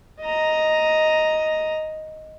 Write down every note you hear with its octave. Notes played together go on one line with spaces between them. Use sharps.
D#5 A#5